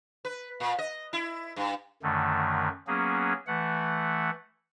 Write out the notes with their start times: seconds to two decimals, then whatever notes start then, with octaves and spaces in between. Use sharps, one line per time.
0.25 B4
0.60 A#2
0.79 D#5
1.13 E4
1.56 G2
2.03 F#2 D3 D#3 A3
2.87 F#3 A#3 B3 C#4 G#4
3.47 E3 A3 F#5